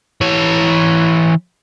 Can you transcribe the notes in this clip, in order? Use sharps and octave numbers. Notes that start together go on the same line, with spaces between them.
E3 C#5